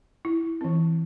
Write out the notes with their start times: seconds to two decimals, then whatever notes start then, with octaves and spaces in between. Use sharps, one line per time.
0.25 E4
0.61 E3 C4